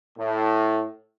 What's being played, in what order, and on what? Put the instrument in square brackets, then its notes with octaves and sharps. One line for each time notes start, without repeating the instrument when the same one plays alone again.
[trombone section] A2